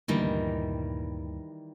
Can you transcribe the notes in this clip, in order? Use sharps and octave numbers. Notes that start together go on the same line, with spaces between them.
D2 G2 A#2 D#3 E3 G3